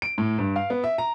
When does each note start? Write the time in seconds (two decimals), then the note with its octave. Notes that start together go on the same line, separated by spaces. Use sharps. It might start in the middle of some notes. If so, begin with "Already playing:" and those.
0.02 D7
0.18 A2
0.39 G2
0.56 F5
0.70 B3
0.84 E5
0.98 A#5